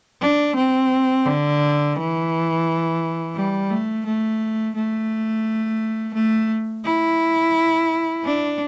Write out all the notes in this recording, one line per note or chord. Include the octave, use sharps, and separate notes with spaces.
D4
C4
D3
E3
G3
A3
A3
A3
A3
E4
D4